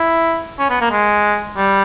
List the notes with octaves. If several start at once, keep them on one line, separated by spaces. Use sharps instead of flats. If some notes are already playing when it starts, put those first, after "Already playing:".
Already playing: E4
C#4
B3
A#3
G#3
G3